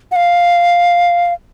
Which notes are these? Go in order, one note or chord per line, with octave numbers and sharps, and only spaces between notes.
F#5
F5